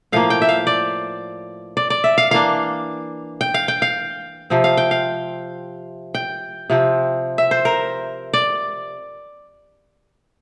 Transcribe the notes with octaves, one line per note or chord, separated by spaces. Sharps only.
A2 F3 A#3 F5
G5
E5
F5
D5
D5
D5
E5
F5
E3 A#3 D4 F5
G5
F5
G5
F5
C3 F3 C4
F5
G5
F5
G5
C3 F3 C4
E5
C5
A#4
D5